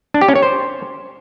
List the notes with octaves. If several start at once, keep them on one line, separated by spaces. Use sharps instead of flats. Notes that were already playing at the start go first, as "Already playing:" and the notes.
D4
G4
C#4
C#5
C5